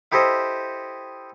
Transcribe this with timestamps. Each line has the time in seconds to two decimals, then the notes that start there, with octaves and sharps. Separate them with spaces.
0.12 E4 G4 A4 C5 D#5